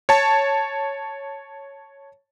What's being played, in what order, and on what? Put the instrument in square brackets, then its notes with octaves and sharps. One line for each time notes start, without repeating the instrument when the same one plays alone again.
[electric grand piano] C#5 A5